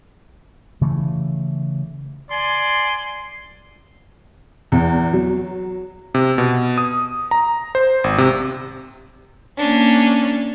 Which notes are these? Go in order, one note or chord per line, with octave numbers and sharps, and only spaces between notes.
C#3 E3 A3
D5 G#5 C6
E2
F#3
C3
B2
D#6
A#5
C5
G#1
C3
A#3 C#4 D4